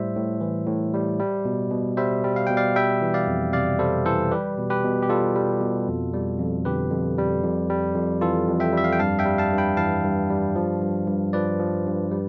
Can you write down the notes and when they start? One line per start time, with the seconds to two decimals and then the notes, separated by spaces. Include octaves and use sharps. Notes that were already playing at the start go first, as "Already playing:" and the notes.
Already playing: A2 G3 C5 E5
0.16 A2
0.41 E3
0.67 A2
0.94 G3
1.20 G3
1.45 B2
1.71 B2
1.97 G3 C5 E5
2.24 G3
2.36 F5
2.47 B2 G5
2.57 D5 F5
2.76 G3 E5 G5
3.02 E3
3.14 D5 F5
3.27 F2
3.53 C3 D5 F5
3.79 G3 A4 C5
4.06 E3 A4 C5
4.32 G3 G4 B4
4.58 B2
4.70 G4 B4
4.84 B2
5.02 G4
5.09 G3 F4 A4
5.35 G3
5.61 B2
5.88 F2
6.14 G3
6.39 F2
6.65 D3 G4 B4
6.92 F2
7.18 G3
7.43 F2
7.70 G3
7.95 F2
8.21 E3 F4 A4
8.48 F2
8.60 E5 G5
8.73 G3 E5
8.84 F5
8.92 G5
8.99 G2 F5 A5
9.19 E5 G5
9.25 G3
9.38 F5 A5
9.52 G2
9.58 G5 B5
9.77 E3 F5 A5
10.04 G2
10.30 G3
10.56 F3
10.82 G2
11.08 G2
11.33 F3 B4 D5
11.59 F3
11.86 G2
12.12 G3